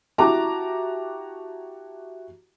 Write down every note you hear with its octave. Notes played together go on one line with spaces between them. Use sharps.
E4 F#4 G4 A5 A#5 D6